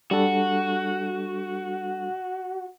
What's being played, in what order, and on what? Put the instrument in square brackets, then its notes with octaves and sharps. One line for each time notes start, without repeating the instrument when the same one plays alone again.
[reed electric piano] G3 D4 A4 [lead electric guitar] F#4